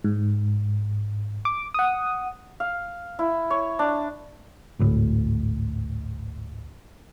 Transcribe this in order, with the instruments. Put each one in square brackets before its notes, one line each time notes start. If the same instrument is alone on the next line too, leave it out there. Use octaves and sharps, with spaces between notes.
[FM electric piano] G#2
D6
F#5 D#6
[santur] F5
E4
C#5
D4
[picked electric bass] G#1 D2 A2